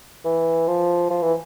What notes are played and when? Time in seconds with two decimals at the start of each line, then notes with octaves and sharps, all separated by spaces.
0.25 E3
0.68 F3
1.10 F3
1.22 E3